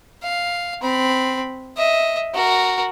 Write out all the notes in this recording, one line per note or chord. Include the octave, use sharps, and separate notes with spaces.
F5
C4 B5
D#5 E5
F#4 A#4